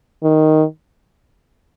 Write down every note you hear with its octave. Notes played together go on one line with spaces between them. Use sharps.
D#3